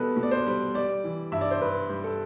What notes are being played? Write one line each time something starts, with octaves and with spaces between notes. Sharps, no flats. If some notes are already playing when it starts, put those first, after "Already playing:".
Already playing: B2 G3 A4 B4
B2
D5
C5
G3
G3 D5
E3
G2 E5
D5
C5
G2 B4
G3
A4